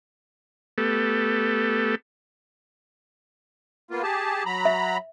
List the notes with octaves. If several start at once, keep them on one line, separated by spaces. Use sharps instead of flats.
A3 B3 G4 A4
A#3 B3 F4
G4 G#4 A5
F#3 A#5 B5
E5